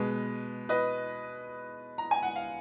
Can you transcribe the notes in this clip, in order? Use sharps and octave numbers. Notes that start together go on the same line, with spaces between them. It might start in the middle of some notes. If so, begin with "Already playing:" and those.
Already playing: B2 G#3 B4
B4 D#5
A#5
G#5
F#5
F5